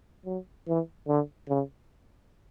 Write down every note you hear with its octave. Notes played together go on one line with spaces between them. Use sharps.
F#3
E3
D3
C#3